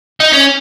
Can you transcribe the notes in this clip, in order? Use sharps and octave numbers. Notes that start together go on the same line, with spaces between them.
D#4
C#4